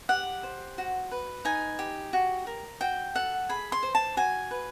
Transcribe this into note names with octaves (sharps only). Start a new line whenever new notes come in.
G4 F#5
C5
F#4
B4
D#4 G#5
G4
F#4
A#4
F#4 G5
A4 F#5
G#4 B5
C6
C5
A5
F#4 G#5
B4